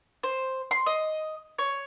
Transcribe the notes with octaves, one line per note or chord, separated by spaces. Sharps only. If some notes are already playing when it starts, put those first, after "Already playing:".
C5
C6
D#5
C#5